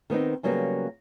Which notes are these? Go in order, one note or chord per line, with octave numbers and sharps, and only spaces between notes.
D#3 B3 C4 D#4
C#3 F#3 G3 A#3 B3